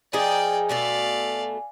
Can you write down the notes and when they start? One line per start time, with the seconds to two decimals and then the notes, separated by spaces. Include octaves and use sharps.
0.13 F3 D#4 G#4 D5 G5 G#5
0.69 B2 A3 A4 D5 F5